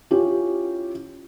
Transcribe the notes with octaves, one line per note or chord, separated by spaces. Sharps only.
C#4 E4 F4 G4